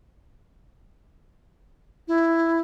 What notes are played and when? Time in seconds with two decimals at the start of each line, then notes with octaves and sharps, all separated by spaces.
2.08 E4